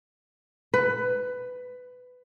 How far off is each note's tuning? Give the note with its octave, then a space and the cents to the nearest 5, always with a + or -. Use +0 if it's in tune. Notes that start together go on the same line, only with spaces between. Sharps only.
B4 +15